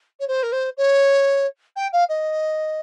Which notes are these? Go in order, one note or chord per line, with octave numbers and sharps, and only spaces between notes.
C#5
C5
A#4
C5
C#5
G5
F5
D#5